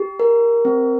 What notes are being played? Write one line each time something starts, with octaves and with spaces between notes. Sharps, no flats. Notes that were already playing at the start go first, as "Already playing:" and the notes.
Already playing: G4
A#4
C4